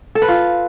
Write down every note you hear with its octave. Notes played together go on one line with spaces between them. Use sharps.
A4
B4
F4